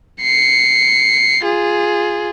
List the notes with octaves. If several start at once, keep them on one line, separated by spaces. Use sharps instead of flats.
C7 C#7
F4 G#4